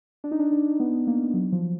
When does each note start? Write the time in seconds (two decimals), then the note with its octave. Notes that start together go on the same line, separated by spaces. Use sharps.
0.24 D4
0.31 D#4
0.39 D4
0.52 D4
0.80 B3
1.07 A#3
1.34 F#3
1.52 F3